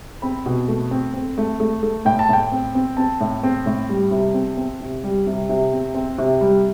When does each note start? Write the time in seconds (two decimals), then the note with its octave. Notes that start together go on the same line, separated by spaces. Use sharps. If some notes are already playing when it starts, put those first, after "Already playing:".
0.22 C4 B5
0.46 B2
0.68 A3
0.91 C4
1.14 C4
1.38 A3
1.60 A3
1.83 A3
2.05 A2 G5
2.19 A5
2.29 A2 G5
2.52 C4
2.75 C4
2.97 C4 A5
3.21 A2
3.43 C4
3.66 A2
3.89 G3
4.11 C3
4.34 C4
4.57 C4
4.81 C3
5.03 G3
5.27 C3
5.49 C3
5.73 C4
5.94 C4
6.18 C3
6.41 G3